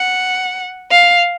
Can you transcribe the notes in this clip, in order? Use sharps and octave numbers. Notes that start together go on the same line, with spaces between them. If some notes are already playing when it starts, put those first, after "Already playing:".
Already playing: F#5
F5